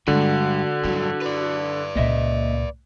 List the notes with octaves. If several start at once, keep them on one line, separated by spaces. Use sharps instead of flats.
G2 D3 G#3 F#4
G2 F#3 E4
B4 D5
C#2 A#2 A#3 D#5 E5